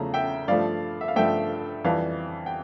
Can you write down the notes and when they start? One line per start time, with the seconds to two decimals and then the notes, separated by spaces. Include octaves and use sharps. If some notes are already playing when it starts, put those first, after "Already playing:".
Already playing: E2 C#3 F3 A3 A#5
0.14 E5 G5
0.48 G2 F3 A3 D5 F5
1.01 E5
1.08 F5
1.16 G2 F3 A3 E5 G5
1.84 F2 E3 G3 F5 A5
2.46 G5